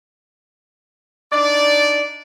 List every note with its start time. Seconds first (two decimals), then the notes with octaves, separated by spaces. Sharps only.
1.32 D4 D#4 D5